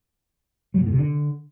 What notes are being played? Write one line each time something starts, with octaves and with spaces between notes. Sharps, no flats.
F#3
A#2
A2
C3
D3